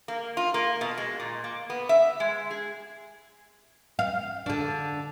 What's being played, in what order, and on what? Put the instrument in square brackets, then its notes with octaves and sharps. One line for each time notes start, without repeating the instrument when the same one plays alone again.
[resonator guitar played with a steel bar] A#3
F4
A#3
B2
G#3
A#2
A#3
B3
E5
G#3
G#4
[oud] F5
D3 D4